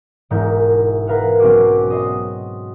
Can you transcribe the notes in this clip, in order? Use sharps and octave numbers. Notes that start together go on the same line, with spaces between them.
E1 G#2 G#3 E4 A#4 G6
A#4 B4 F5 F#5
B1 C4 C#4 F#4 D6
D#5 C6